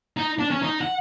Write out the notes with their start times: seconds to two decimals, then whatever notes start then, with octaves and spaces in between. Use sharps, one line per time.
0.17 D#4
0.39 D4
0.51 C#4
0.62 D#4
0.81 F#5